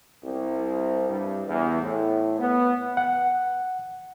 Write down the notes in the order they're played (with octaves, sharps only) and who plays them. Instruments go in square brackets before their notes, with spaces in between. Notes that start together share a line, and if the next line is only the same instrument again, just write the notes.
[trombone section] C2
G2
E2
A2
B3
[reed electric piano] F#5